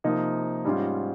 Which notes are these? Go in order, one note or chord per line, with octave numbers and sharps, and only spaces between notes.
C3 F3 A#3 D#4
G#2 G3 C#4 F4